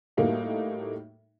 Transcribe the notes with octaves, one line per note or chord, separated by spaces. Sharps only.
A2 G3 A3 A#3 D#4 F#4